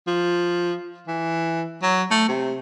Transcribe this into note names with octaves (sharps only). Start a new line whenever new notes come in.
F3
E3
F#3
A3
C3